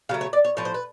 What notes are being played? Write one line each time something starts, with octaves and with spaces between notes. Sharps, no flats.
C#3 F#3 A3 F5
C#5
D5
C#5
A2 F3 C#5
C5
B4